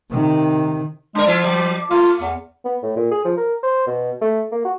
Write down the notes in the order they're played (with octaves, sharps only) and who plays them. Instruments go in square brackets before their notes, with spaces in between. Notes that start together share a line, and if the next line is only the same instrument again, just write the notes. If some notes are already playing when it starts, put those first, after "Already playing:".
[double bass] C3 D#3
[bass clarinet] G#3 [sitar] D4 A#4
[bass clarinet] F3 [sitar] E4 F4
[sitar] F#3
[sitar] A3 [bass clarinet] F4
[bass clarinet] E2
[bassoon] B3
A2
A#2
G#4
F3
A#4
C5
B2
A3
A#3
F#4